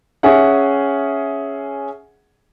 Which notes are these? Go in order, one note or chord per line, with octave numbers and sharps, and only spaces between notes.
C#4 G#4 E5 F#5